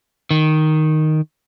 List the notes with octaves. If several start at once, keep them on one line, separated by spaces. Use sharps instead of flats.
D#3